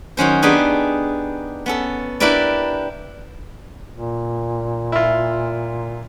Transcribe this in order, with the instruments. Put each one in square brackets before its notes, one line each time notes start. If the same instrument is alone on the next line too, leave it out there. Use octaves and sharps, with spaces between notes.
[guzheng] D#3 F#3 C#4 C5
B3 D4 D#4 G4 G#4 B4
B3 C#4 A4
D4 E4 G4 A#4 B4 D5
[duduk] A#2
[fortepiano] E4 F4